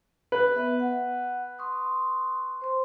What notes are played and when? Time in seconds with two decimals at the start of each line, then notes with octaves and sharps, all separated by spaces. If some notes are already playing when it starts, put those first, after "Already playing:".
0.32 B4
0.56 B3 E5
0.80 F#5
1.59 C6 C#6 D#6
2.61 C5 C6